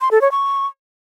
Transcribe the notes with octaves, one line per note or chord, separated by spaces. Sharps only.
C6
A4
C#5
C#6